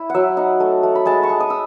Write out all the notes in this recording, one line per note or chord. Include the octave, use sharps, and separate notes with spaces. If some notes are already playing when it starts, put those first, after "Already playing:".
Already playing: E4
F#3 E5 F#5
D#4 F#5
A3
A3
B5
G#3 A5
C#6
G#3
D#6
E6